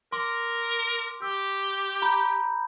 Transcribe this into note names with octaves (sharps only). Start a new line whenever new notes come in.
A#4 C6 D6
G4 E6
A#5 B5 G6